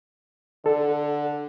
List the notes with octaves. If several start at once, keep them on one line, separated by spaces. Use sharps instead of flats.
D3 A4